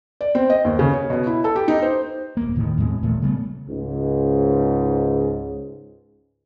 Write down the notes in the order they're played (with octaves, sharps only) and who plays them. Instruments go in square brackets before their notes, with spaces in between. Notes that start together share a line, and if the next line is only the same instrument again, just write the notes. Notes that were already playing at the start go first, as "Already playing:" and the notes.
[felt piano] D5
C4
D#5
D#2
C#3
C#5
B2
E4
A4
G4
D#4
C5
[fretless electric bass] D#1 A#3
E1 A2 D#3
E2 A2 G#3 C4
D#1 A1 A#2 A3
C#3 G3 A3 B3
[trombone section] C#2 G#2